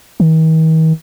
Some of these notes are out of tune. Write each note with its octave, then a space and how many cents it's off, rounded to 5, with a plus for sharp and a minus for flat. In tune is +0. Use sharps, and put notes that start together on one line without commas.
D#3 +45